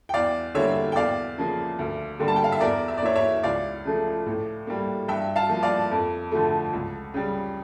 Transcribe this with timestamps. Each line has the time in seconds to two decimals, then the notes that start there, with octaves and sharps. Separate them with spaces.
0.09 G5
0.14 E2 D5 F5
0.55 D3 G3 A#3 C#5 E5
0.92 G5
0.96 E2 D5 F5
1.38 C#3 F3 A#3
1.79 D2
2.20 D3 G3 A#3
2.28 A5
2.36 G5
2.44 F5
2.52 E5
2.60 E2 A#4 D5
2.88 E5
2.98 D5
3.02 E3 A#3 C#5 E5
3.16 C#5 E5
3.43 C#2 D5 F5
3.85 C#3 F3 A3
4.26 A2
4.67 G3 A#3
5.08 G2 E5 G5
5.36 F5 A5
5.49 F3 A#3
5.63 D5 F5
5.91 F2
6.31 D3 F3 A3
6.73 C#2
7.14 C#3 G3